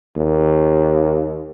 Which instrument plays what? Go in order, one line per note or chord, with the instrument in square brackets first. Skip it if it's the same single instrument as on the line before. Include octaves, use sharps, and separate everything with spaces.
[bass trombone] D#2